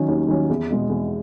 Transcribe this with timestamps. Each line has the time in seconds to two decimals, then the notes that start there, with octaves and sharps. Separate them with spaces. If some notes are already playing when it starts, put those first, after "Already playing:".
Already playing: D#3 F#3 C#4
0.08 D#2
0.28 D#3 F#3 C#4
0.49 E2
0.70 B2 G#3
0.89 E2